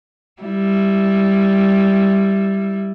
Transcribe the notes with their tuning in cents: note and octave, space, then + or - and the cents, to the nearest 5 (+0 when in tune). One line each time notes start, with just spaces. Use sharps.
G3 +0 E4 +0